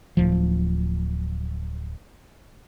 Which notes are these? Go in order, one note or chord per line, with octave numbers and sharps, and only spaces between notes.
D1 F3